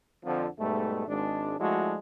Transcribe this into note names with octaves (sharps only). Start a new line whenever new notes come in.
F2 D3 F3
G#2 B2 G3 A3
G#1 G#3 D4
F3 G#3 A3 D4 E4 F#4